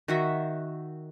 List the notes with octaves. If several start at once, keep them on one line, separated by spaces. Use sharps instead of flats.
D#3 F#4 E5